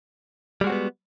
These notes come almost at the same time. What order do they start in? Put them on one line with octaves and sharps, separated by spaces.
G3 G#3 F#4 C4 B3